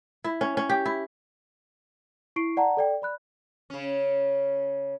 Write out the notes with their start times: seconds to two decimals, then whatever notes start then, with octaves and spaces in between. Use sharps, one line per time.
0.24 E4
0.41 C#4
0.57 C#4
0.69 G4
0.86 E4
2.36 E4 C#6 C7 D7
2.57 D5 F#5 A5 A#5
2.77 A4 D5 G5
3.02 D5 B5 F#6
3.70 C#3 C#4